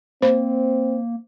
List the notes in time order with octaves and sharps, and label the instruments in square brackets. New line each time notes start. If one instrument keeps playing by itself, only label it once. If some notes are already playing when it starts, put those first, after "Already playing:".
[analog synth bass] A#3 [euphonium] C4 [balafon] C5